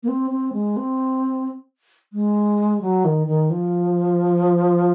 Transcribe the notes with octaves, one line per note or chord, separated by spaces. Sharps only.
A#3
C4
C4
G#3
C4
G#3
F#3
D#3
D#3
F3